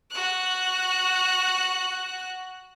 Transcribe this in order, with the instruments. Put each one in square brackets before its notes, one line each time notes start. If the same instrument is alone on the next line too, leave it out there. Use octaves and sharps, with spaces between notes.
[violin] F#4 F#6